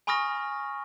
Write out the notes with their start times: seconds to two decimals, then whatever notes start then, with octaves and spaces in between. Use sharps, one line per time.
0.07 G#5 B5 C#6 D#6 F6 A#6